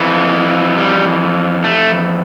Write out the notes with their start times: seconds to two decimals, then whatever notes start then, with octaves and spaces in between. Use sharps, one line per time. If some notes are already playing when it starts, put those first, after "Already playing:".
Already playing: F2 E3
0.78 G3
1.64 A3